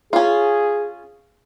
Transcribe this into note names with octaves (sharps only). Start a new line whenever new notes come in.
C#4 F4 G#4